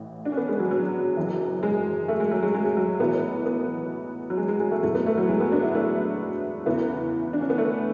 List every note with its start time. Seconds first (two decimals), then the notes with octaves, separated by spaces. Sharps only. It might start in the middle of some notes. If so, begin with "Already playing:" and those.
Already playing: A1 A2 E3
0.25 D4
0.32 C#4
0.37 B3
0.48 G#3
0.59 F#3
0.71 F#3
1.17 F#1 F#2 E3
1.63 G#3
2.08 A3
2.20 G#3
2.31 F#3
2.43 G#3
2.54 G#3
2.65 G#3
2.77 F#3
3.00 B1 A2 E3 B3
3.46 B3
4.30 F#3
4.37 G#3
4.49 G#3
4.60 G#3
4.71 A3
4.83 F#1 E2 B2 A3
4.95 B3
5.06 A3
5.17 F#3
5.29 G#3
5.40 B3
5.52 D4
5.63 E4
5.75 A3
6.66 E2 C#3 E3 B3
7.33 D4
7.41 C#4
7.50 B3
7.58 A3